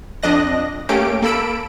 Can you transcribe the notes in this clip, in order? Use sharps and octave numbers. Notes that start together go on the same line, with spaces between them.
F2 D4 D#5 F#6 A#6
A3 A#3 C#4 G4 D7
A#3 A4 B5 E6 D7